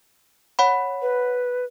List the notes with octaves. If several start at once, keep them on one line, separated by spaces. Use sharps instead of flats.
C#5 F#5 B5
B4